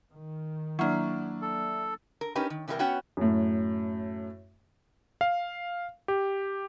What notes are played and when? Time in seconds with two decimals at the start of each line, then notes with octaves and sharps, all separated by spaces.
0.12 D#3
0.79 F#3 A#3 D4 E4
1.42 A4
2.21 A#4
2.35 C#4 D#4 G4 A#4 B4
2.50 D#3
2.68 C3 E3 G3 D#4 A#4 G5
2.79 B3 C#4 F#4 C#5 F#5 G5
3.17 F#2 A2
5.21 F5
6.08 G4